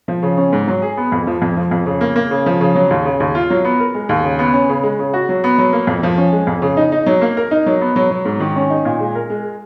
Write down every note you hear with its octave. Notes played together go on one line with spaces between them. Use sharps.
F3
C#3
C#4
G#2
F#3
G#4
B3
F2
F3
F2
F3
F2
C#3
A#3
A#3
C#3
F3
C#3
F#3
D#2
C#3
D#2
F4
F#3
B3
A#4
G#3
D#2
C#3
B3
C#4
C#3
G#3
C#3
F#4
F#3
B3
F#3
A#3
F2
F3
C#4
G#3
F2
C#3
D#4
D#4
F#3
A#3
A#4
D#4
F#3
B3
F#3
F#3
G#2
D#3
C#4
D#4
A#2
G#3
A#4
G#3